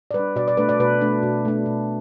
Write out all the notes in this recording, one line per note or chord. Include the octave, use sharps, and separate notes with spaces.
D5
G3 B4
D4
B2 D5
D5
A3 D4 B4
D5
B2 B4
A3 D4
B2
A3 D4
B2